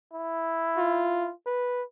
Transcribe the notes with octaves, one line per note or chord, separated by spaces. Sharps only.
E4
F4
B4